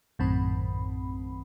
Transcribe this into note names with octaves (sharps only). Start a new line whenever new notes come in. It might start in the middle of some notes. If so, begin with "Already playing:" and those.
A#1 F#2 A2 D#3 C4 B5